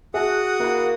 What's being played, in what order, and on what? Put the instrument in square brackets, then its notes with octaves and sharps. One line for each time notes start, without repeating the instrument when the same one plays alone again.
[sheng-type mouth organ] F#4 F#5 D#6 [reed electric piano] G#4 [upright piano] E5 A5
[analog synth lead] A#3 [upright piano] E4 B5